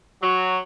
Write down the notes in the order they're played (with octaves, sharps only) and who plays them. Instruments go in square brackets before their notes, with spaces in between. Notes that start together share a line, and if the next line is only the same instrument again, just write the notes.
[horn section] F#3